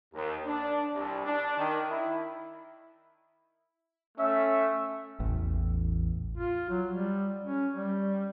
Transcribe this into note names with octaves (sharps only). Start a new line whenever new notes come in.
D#2
D4
C2
D4
D#3
E4
A3 C#4 E5
A1 E2
F4
F#3
G3
C#4
G3